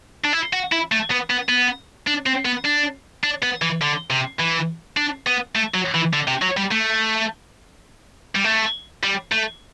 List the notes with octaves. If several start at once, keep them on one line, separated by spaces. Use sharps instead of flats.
D4
E4
F#4
E4
A3
B3
B3
B3
D4
C4
B3
D4
D4
B3
E3
D3
C3
E3
D4
B3
A3
F#3
E3
D3
C3
F#3
G3
A3
G3
A3
G3
A3